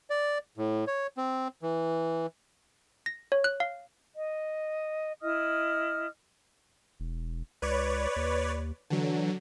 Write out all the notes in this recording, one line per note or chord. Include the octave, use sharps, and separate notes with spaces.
D5
A2
C#5
C4
E3
A#6
C#5
F#6
F5
D#5
E4 D#5 D#6 F6
E1
C#2 B4 C#5 D5
D#2
D3 E3 F#3